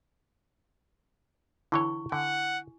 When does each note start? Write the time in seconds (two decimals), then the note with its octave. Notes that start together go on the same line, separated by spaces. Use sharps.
1.72 D3 E3 E4 C#5 C#6
2.12 D3 F#5 G#5